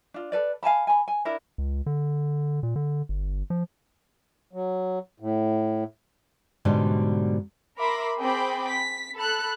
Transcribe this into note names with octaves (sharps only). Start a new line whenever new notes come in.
D4 F4
A4 B4 D5
F5 G#5 A5 B5
G#5 B5
G#5
D4 E4 A#4 B5
C#2
D3
A#2
D3
G1
F3
F#3
A2
G#2 B2 D3 F#3 G3
A#4 E5 B5 C6 D6 A#6
C4 G#4 G5 B5 D6
B6
A4 B5 F#6